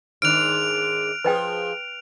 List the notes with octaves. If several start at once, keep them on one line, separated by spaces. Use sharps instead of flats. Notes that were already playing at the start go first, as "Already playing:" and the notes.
G#2 D#3 D4 F6 F#6 D7 F7
F3 G#4 B4 D#5 G5